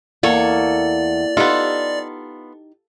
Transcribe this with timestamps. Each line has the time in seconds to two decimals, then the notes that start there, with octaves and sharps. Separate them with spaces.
0.23 E2 A#3 A4 C#5 D5
1.37 B3 D#4 F4 G4 A4